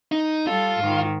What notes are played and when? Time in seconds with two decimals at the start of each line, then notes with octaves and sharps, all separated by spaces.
0.12 D#4
0.47 G3 F4 A4
0.80 G#2 D#3